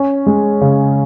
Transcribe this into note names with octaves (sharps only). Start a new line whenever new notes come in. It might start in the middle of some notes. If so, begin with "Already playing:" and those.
Already playing: C#4
G#3
C#3